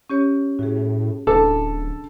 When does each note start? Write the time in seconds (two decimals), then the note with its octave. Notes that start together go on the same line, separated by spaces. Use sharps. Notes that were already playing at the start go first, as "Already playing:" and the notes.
0.10 C#4 G4 C#5
0.59 A2 F#4 G#4
1.27 D1 D4 A4